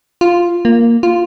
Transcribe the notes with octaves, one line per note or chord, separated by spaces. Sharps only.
F4
A#3
F4